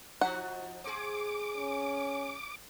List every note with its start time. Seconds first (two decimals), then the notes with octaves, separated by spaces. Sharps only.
0.21 F3 D#4 F#4 F#5
0.84 C4 G#4 D6
1.58 C#4